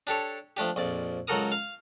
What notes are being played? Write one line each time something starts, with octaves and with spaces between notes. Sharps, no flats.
D4 G4 A4 C#5
F3 A3 D4 G4
A#1 F2 D5
C#2 F#3 F#4 A4 A#4 D#6
F5